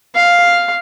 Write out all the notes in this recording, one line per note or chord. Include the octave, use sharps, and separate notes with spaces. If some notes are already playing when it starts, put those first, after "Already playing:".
F5